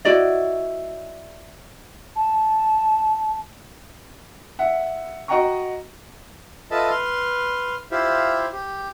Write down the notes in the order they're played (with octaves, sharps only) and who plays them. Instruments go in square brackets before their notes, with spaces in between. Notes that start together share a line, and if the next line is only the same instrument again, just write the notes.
[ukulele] E4 F#4 D5 D#5
[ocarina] A5
[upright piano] E5 F#5
F#4 D#5 F#5 G5 A#5 C#6
[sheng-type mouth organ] F4 A4 B4 D#5 E5 A5
B4 C6 F6
E4 F4 G4 C5 E5 F5
G4